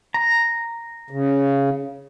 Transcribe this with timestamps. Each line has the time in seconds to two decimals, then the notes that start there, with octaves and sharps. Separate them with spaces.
0.14 A#5
1.10 C#3